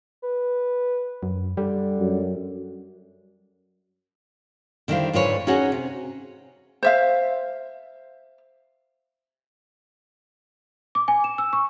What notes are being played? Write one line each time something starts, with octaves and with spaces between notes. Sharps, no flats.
B4
F#2
D3 G3
F#2
D3 D#3 G3 E4 C5 F5
G#2 D3 F4 B4 C#5 G#5
C#4 D#4 F#4 G#4 C#5 F#5
C3
C5 E5 F5
D6
G#5
E7
E6
C#6